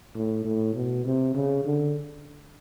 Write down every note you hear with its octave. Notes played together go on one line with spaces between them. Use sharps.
A2
A2
B2
C3
C#3
D3